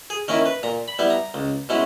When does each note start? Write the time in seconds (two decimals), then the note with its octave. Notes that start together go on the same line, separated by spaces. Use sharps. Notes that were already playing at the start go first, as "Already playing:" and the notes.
0.10 G#4
0.28 D#3 A#3 C#4 E4 A#4
0.46 B4
0.63 A#2 A#5
0.88 B5
0.99 G3 B3 E4
1.10 A#5
1.34 C#2
1.69 B2 G#3 C#4 E4